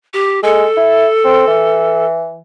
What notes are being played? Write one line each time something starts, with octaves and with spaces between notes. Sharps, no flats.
G4
G#3 A4
E4
C4
E3